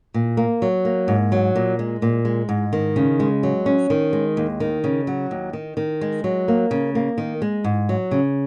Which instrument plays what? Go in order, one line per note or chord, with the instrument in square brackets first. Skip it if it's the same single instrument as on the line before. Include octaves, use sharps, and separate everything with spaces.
[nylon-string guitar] A#2
A#3
F#3
A#3
G#2
F#3
A#2
G#3
A#2
G#3
G#2
D#3
C#3
G#3
F#3
C#4
D#3
G#3
D#2
D#3
C#3
F#3
D#2
D#3
D#3
G#3
F#3
A#3
C#3
A#3
D#3
G#3
G#2
F#3
C#3